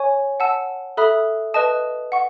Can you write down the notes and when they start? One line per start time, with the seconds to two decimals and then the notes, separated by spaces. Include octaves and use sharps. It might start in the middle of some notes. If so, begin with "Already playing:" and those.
Already playing: C#5 G#5 C#6
0.40 F#5 A5 E6
0.97 A4 E5 B5 D#6 F#6
1.54 B4 D#5 A5 D#6
2.12 F#5 C#6